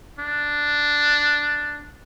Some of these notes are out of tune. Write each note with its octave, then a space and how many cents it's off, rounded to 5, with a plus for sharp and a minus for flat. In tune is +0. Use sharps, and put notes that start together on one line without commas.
D4 +0